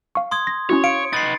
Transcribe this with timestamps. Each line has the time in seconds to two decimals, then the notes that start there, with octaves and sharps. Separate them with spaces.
0.15 F5 C#6
0.31 C6 D#6 G#6
0.47 A#6
0.69 C#4 E4 F#4 C#5
0.84 F5 C#7 D7
1.13 D#4 B4 A6 C7